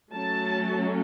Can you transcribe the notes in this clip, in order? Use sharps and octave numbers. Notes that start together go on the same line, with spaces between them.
F#3 A3 C#4 A5